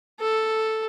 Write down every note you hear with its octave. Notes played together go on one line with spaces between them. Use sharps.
A4